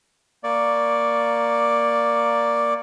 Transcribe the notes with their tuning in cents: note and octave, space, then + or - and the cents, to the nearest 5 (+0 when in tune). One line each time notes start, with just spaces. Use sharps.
A#3 +0 D5 +0 C#6 +0